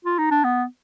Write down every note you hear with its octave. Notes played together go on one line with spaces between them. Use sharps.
F4
D#4
D4
B3